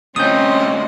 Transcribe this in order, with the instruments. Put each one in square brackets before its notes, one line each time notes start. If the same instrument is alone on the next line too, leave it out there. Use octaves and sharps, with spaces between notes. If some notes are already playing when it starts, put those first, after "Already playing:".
[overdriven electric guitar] D2 F4 [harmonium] C4 [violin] C#4 D#5 [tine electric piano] D#6 G6